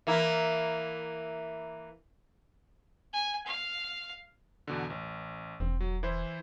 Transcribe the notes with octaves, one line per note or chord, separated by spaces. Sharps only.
E3 A#3 E4
G#5
F5
E2 B2 D3
A1
E1 C4
F#3
E3 E4 C5